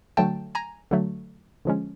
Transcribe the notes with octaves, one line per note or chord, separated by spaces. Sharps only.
D3 F#3 A3 G5 A5
G#5 A#5
D3 F#3 A3
D3 F3 G#3 C#4